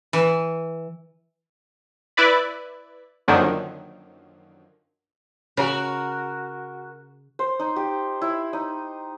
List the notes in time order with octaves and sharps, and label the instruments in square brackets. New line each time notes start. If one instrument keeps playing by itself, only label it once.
[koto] E3
[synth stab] E4 B4 D5 B5
F#2 D3 D#3 F3 F#3 A#3
[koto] C#3 [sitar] F#4 A#4
[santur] C5
D#4
G4
E4
D#4